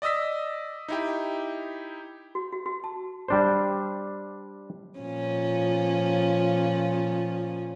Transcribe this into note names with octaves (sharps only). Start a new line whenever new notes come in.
D5 D#5 D#6 E6 B6
D#4 E4 G4
F#4
F#4
F#4
A5
G3 D4 C5
A#2 F3 C#4